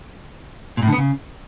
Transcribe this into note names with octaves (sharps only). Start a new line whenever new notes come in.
A#2
A2
D3
B3
C#3